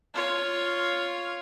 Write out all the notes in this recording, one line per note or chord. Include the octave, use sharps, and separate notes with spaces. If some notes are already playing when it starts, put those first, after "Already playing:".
F4 C#5